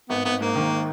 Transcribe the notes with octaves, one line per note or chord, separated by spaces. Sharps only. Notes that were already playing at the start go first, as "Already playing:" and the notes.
G#1 B3
G#1 B3
G#2 A#3
D#3